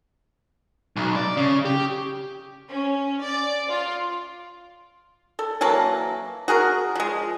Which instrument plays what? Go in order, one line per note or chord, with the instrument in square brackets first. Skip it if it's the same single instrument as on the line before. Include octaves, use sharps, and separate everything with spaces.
[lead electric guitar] B1
D5
C#3
G4
[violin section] C#4
D5
F4
[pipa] A4
E3 F#3 A#3 A5
F#4 G#4 A#4
F3 G#3